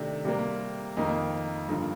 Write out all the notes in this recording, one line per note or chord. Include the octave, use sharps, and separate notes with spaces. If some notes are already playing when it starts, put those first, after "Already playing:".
Already playing: C3 D#3 A3 D4
C3 G3 A#3
F2 D#3 A#3 D#4
G2 D3 F3 A#3 D#4